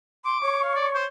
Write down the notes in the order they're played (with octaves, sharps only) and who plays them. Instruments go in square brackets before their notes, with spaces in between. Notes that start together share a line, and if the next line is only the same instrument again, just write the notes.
[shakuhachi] C6 [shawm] D6
[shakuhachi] C#5 [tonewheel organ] C#6
[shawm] F5
D5
C5